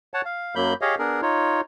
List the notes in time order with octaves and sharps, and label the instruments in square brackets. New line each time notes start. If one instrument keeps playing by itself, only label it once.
[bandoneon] C#5 F#5 A5
F5
F#2 F#3 A#3 B5 G6
G4 G#4 C#5 D#5 F5
B3 D4 G#4 A#4
D#4 F4 C#5